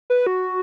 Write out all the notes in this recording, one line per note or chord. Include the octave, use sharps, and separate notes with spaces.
B4
F#4